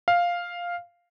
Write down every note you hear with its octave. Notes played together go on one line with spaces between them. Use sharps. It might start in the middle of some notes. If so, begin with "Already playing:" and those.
F5